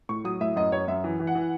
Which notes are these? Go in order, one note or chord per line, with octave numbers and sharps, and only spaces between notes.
A2 C#6
F#3 D#6
A2 E5
F#2 D#5
F#2 C#5
F#2 E5
E3
E3
F#5
E3